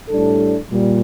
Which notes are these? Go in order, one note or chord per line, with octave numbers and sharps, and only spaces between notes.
A2 G3 D4 A4
A#2 G3